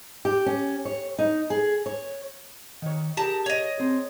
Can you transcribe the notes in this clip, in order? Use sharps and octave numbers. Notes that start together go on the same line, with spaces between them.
G4
C#4
C#5
D#4
G#4
C#5
D#3 C#5
G4 G#4 A#4 A5 A#5
C#5 D#5
C4 G#4